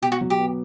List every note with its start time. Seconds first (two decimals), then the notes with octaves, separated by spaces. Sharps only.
0.02 B2 G4
0.12 F#4
0.21 F#3
0.30 G4
0.39 B3